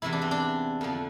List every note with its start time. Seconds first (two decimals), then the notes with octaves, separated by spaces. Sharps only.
0.02 E2 C3 E3 E4
0.13 D4
0.21 C4
0.31 D4
0.81 F2 D3 F3